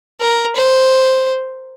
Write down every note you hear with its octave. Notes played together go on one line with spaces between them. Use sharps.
A#4
C5